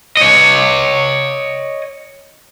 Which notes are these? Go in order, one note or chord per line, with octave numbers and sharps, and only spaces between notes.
C#5 D#5